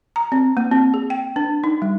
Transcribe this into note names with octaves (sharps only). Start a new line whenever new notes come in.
A#5
C4
A#3
C4
G#4
G5
D4
D#4
G3